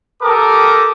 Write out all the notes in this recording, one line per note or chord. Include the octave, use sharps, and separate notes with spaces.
G4 A4 A#4 D6 D#6